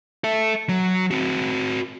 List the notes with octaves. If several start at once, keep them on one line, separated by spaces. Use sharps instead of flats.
A4 E5
F#3
C4 F#4